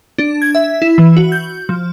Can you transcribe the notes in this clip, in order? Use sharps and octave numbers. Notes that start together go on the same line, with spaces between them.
D4
G#6
E5
E4
E3
F#4
G6
F3